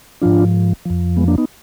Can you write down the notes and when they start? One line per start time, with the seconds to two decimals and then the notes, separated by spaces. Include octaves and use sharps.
0.22 G#2 F3 D4 F4
0.85 F2 F3
1.17 G#3 B3
1.28 A#3 D4
1.38 B3 D#4